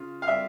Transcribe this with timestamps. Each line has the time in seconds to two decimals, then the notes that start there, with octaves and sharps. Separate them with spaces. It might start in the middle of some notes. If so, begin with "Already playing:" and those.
Already playing: C#3 F4
0.22 F5
0.28 G3 E5